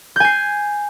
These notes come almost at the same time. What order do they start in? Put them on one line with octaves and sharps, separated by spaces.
G6 G#5 C7